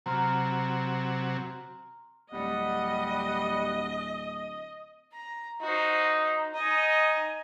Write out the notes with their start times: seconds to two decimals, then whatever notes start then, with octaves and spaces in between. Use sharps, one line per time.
0.06 C3 F#3 A#5 C6 F6
2.32 D1 G3 D#5 F#5
5.12 A#5
5.61 D#4 F#4 C5
6.54 D#4 D#5 G#5